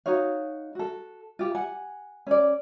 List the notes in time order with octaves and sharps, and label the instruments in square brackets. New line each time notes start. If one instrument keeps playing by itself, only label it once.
[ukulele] D#4 F#4 C#5 F5
F#4 A4
F4 G4
F#5 G#5
C#4 D5